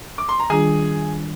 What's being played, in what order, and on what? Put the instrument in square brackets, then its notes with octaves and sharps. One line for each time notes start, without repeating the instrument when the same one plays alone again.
[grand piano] D6
C6
A#5
[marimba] D#3 G3 D4 F4 [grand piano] G#4 G#5